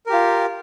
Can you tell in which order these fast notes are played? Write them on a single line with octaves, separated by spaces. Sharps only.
A#4 G4 F4